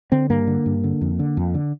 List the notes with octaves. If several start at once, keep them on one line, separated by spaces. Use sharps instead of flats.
D3 C4
G2 A#3
D3
G2
D3
F2
D3
F2
D3